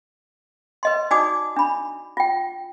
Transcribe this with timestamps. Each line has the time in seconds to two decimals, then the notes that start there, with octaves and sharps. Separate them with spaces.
0.83 B4 D#5 C6
1.11 D#4 F#4 D5 G#5 D6 D#6
1.56 D4 B5
2.17 F4 G5